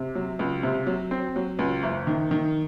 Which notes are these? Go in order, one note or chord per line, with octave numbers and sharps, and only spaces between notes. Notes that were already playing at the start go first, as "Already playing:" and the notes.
Already playing: C3
F#3
C#2
C3
F#3
C4
F#3
C#2
F#1
D#3
D#3